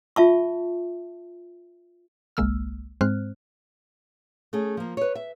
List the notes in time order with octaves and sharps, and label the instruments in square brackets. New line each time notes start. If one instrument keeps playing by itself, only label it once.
[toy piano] F4 E5 A5 C#6
[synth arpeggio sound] G1 C2 G#3 A#3 E6 F6
G#2 G#3 C4 C5 F6 F#6
[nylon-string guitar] A3 C#4 G#4
F3 A#3
B4 C#5
E5